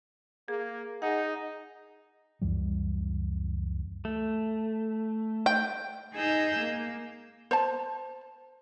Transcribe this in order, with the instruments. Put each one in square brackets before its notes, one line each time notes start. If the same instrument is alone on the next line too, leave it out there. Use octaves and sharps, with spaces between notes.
[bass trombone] A#3 [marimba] G#4
[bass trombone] D#4 [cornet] G#4 [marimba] F#5
[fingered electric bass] C#2 F#2 E3 G3
[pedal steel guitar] A3
[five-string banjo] G5
[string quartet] D#4 G#4 D#5 A#5 E6 G6
A#3
[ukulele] C5 A5